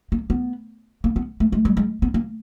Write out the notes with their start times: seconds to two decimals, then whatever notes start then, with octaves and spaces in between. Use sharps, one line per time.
0.12 A#3
0.30 B3
1.04 A#3
1.16 B3
1.40 A3
1.52 G#3
1.65 G3
1.77 G#3
2.02 B3
2.14 A#3